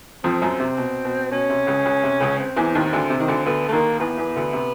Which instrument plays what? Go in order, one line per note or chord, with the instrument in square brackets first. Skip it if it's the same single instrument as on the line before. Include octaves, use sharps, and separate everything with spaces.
[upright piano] F2 F3 [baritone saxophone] C4
[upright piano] F#2 F#3
C3
B2
B2
[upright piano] B2 [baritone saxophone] C#4
[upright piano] C3
C#2 C#3
C#2 C#3
C3
C#2 C#3
[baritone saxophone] C4
[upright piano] E2 E3
D#2 D#3
D2 D3
C3
D#3
D2 D3
[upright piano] D2 D3 [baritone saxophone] B3
[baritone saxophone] A3
[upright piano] D#2 D#3 [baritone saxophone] A#3
[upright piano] E2 E3 [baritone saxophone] B3
[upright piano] E2 E3
D2 D3
C3